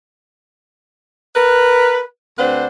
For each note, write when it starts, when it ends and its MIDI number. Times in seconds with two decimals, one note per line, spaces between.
1.36 2.03 70
1.36 2.03 71
2.39 2.67 38
2.39 2.67 60
2.39 2.67 62
2.39 2.67 71
2.39 2.67 72
2.39 2.67 78